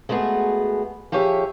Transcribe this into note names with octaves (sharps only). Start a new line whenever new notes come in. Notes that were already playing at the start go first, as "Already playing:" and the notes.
G#3 A3 B3 F#4 G#4
F3 G4 G#4 C#5 E5